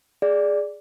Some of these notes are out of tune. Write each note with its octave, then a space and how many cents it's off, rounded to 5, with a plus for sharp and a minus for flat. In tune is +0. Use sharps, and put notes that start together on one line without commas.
G#4 +0 D5 +0